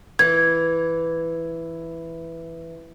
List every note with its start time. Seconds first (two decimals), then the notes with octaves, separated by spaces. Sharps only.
0.19 E3 G#6